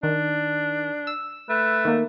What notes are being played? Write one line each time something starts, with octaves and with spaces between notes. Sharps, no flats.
D#3 D4
E6
A3 B4
D#3 A#3